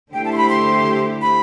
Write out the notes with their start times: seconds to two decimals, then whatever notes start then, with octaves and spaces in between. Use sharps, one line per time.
0.12 D3 A3 E4 G4 C5 G5
0.25 A5
0.32 C6
0.37 B5
0.49 C6
1.21 B5